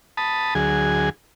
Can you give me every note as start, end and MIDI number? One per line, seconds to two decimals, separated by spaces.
0.17 0.54 81
0.17 0.54 83
0.17 0.54 87
0.55 1.09 38
0.55 1.09 54
0.55 1.09 68
0.55 1.09 80